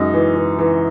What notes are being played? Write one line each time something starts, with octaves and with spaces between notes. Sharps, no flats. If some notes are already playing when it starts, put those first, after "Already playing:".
Already playing: F#2 G#3 D#4
E3
E3
E3